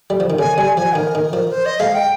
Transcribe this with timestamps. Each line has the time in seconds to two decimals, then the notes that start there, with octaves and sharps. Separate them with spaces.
0.10 G3
0.20 F3
0.30 D#3
0.39 C#3 G#5
0.58 G3 G#5
0.77 F3 G#5
0.95 D#3 A#4
1.15 D#3
1.33 F3
1.52 C5
1.66 D#5
1.80 G#3 F5
1.94 G5